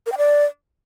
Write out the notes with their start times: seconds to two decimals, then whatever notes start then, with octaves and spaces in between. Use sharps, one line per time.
0.06 A#4
0.12 G5
0.18 D5